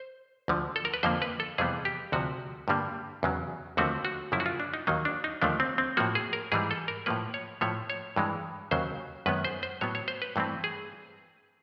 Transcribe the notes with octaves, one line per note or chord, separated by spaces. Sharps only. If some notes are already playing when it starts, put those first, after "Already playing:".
Already playing: C5
D2 D3 F3
A4
A#4
B4
F2 D3 F3 A#3 C5
B4
A4
F2 C3 E3 G3 B3 G#4
G4
D2 C3 F3 F#4
G2 D3 G3 A#3
E2 C#3 F#3
D#2 D3 F3 A3 C4 F#4
F#4
F#2 C#3 F3 A#3 E4
F#4
F4
D4
D#4
D#2 D#3 F#3 A#3 D#4
D4
D#4
D#2 D3 F3 A3 D4
C4
C4
A2 F3 A#3 F#4
G#4
A#4
G#2 E3 G3 G#4
A4
A#4
A2 F3 A#3 B4
C#5
A2 F3 A3 C#5
C#5
G2 E3 G#3
D#2 C#3 F#3 C5
F#2 D#3 G#3 B3 B4
C5
C5
A2 F#3 B3 C#5
C#5
C5
B4
G2 E3 A3 C4
G#4